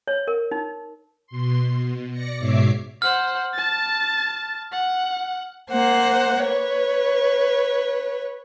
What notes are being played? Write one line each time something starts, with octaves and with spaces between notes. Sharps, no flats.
C#5
A#4
D#4
B2 C6
B2
D5 A#6 C#7
G#2 B2 C#5 E5 D6 C7
C5 F#5 F6
A5 A6
F#5
A#3 C5 F#5
B4 C#5